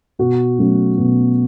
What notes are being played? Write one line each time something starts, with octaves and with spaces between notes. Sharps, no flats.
B2 F#4
F#3 A3 C#4
B2